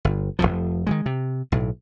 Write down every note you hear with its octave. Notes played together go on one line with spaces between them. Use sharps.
G1
F1 C2 F2 F3
D#3 E3 G#3
C3
B1 A2